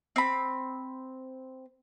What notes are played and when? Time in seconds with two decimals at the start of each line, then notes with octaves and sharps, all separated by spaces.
0.16 C4 B5